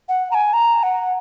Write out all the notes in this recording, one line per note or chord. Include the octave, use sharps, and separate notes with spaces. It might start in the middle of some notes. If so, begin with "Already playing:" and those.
F#5
A#5
G#5
A#5
F#5